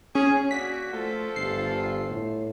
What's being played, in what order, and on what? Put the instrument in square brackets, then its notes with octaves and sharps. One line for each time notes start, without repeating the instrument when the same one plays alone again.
[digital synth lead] C#4 [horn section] G#4
[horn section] A#3 D4 F#4 [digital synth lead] B6
[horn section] F3 F4 A4 [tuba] A3
[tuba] G1 [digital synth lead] C7
[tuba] A2